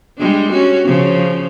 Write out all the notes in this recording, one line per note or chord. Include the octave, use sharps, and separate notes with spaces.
G3 G#3 D4
C#4 F#4
C#3 F3